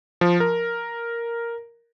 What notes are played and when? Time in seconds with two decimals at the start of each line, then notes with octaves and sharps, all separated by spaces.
0.21 F3
0.40 A#4